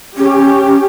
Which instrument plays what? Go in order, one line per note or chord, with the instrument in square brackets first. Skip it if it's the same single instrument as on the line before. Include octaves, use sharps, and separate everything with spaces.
[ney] C#4 [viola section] G4